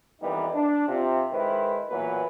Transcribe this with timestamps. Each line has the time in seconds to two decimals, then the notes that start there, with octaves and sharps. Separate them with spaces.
0.21 F2 E3 G3 A#3 B3 D#4
0.54 D4
0.87 C3 F4
1.31 D#3 G#3 E4 B4 C5
1.89 A1 A#2 E3 F#3 B3 B4